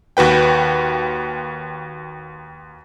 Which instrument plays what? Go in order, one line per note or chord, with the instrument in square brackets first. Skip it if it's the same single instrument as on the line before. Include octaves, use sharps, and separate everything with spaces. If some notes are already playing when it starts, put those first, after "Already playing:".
[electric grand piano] D#2 F#4 B4 G5